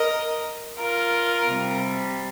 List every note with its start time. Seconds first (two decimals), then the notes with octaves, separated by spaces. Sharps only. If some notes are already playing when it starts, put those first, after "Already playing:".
Already playing: A#4 D#5
0.79 F4 A#4
1.46 C3 G3